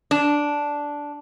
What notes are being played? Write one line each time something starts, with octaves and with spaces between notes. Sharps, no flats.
D4